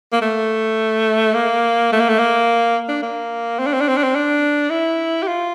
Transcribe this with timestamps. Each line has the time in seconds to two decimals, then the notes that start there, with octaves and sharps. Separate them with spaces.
0.13 A#3
0.22 A3
1.34 A#3
1.93 A3
2.00 A#3
2.09 A3
2.19 A#3
2.89 D4
3.03 A#3
3.59 C4
3.67 D4
3.73 C4
3.81 D4
3.88 C4
3.97 D4
4.03 C4
4.15 D4
4.70 E4
5.23 G4
5.28 F4